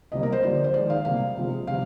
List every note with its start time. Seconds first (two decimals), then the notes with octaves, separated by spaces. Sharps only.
0.12 C3 G3 A#3 D#5
0.23 A#4
0.32 C5
0.43 D3 F3 A#3 D5
0.64 C5
0.74 D#3 G#3 D5
0.90 F5
1.05 C3 G3 A#3 F5
1.37 C3 F3 G#3
1.67 C3 G3 F5